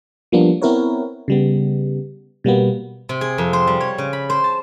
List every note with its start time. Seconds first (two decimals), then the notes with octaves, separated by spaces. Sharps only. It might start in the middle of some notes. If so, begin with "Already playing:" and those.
0.32 F3 G3 A#3 B3 D4
0.62 B3 C4 E4 A#4 B4 C#5
1.28 C#3 G3 B3
2.44 B2 G3 A#3 B3
3.09 C3
3.21 G#4
3.38 F2
3.53 C5
3.67 G3
3.80 C#5
3.98 C#3
4.13 B5
4.30 C5
4.44 A5